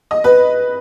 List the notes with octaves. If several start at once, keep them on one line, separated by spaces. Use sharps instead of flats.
D#5
B4